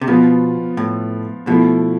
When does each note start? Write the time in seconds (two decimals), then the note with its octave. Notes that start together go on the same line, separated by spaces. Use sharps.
0.01 C3
0.08 B2 F3 B3 F4
0.77 A2
1.47 B2 F3 A3 E4